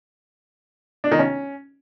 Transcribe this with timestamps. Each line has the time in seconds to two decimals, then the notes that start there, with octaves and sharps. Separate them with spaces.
1.04 D4
1.11 D#3
1.19 C#4